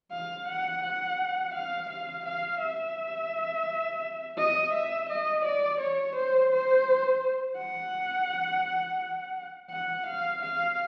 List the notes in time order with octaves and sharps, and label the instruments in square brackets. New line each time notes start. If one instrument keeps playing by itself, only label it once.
[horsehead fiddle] F5
F#5
F#5
F5
F5
F5
E5
D#5
E5
D#5
D5
C#5
C5
C5
F#5
F#5
F5
F5